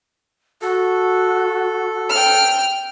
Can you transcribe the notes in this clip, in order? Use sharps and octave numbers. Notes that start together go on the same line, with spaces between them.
F#4 A4
G5 F6